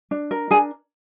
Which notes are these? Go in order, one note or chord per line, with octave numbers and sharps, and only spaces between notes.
D4
A#4
D4 G#4 G#5